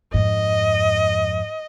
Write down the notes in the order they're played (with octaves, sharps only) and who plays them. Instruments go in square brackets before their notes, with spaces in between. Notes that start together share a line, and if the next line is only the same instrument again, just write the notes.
[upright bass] F2 G#2 [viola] D#5